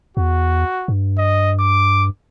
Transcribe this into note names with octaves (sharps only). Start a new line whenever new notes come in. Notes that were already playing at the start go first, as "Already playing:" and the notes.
E2 F#4
G2
D#5
D6